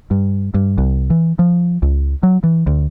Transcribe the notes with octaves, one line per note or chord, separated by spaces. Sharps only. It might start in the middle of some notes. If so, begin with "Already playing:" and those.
G2
G2
C2
E3
F3
C#2
F#3
E3
D2